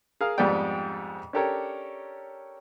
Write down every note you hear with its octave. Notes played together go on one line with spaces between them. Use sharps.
G#4 A#4 F5 F6
F2 G#2 G3 B3 D5 G5
C#4 D4 G4 A4 A#4 C#5